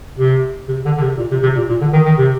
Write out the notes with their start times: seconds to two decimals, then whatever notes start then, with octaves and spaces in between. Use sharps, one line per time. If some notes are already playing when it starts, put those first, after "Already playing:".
0.18 C3
0.68 C3
0.85 D3
0.97 D3
1.01 C3
1.17 A#2
1.31 C3
1.42 C3
1.55 A#2
1.69 A#2
1.81 D3
1.93 D#3
2.06 D#3
2.18 C3